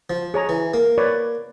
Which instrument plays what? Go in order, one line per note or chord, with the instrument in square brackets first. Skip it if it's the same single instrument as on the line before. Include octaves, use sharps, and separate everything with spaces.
[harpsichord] F3
[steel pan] G#4 C#5 A#5
[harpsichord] E3
A#3
[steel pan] B4 C#5 D5